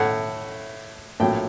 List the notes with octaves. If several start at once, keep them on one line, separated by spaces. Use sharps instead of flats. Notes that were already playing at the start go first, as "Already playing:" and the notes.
Already playing: A2 A3 F#5
A#1 A2 F#3 G5